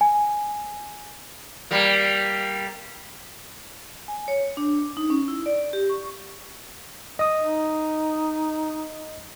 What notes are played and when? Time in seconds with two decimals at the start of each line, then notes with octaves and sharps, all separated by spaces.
0.01 G#5
1.71 G3 A#3
4.08 G#5
4.28 C#5
4.57 D4
4.97 D#4
5.10 C#4
5.28 E4
5.46 D5
5.73 G4
5.90 C#6
7.19 D#5 D#6
7.41 D#4